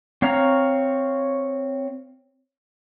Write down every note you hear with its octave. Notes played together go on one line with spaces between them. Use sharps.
C4 C#5 F5 A#5